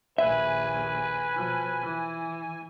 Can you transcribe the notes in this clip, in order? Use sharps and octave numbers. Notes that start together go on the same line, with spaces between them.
A#1 D#2 B4 E5 G#5
B2 F3
E3